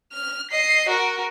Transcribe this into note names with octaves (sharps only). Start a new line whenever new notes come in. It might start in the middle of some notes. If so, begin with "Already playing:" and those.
F6
D#5 C7
F#4 A#4